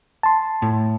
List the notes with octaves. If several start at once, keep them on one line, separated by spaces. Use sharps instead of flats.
A5 C6
A2